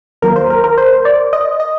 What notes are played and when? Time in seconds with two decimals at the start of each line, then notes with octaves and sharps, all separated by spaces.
0.22 D#2 D#3 F#3 A#3 A#4
0.36 C5
0.50 A#4
0.64 A#4
0.78 C5
1.05 D5
1.33 D#5
1.60 D#5